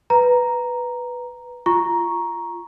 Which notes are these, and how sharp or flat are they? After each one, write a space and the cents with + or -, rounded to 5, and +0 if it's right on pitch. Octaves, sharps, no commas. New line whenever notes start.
B4 +0 A#5 +0
F4 -20 A#5 +10 C#6 +0